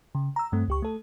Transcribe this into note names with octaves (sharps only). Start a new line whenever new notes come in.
C#3
A#5 E6
G2 A3 C4
C#2 G4 C#6
A3 A4